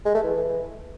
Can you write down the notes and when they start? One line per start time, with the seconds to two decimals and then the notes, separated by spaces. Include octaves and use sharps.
0.05 G#3
0.15 A3
0.24 E3